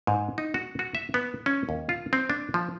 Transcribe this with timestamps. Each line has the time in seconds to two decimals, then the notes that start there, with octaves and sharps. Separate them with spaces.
0.07 G#2
0.38 D#4
0.54 F#4
0.79 F#4
0.95 E5
1.14 B3
1.46 C#4
1.69 D#2
1.89 F4
2.13 C4
2.30 D4
2.54 F3